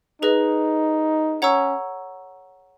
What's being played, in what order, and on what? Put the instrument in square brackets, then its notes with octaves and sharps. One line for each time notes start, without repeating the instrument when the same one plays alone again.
[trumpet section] D#4 [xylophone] G#4 B4 D#5
[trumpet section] C#4 [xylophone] C#5 F#5 A#5 C#6 E6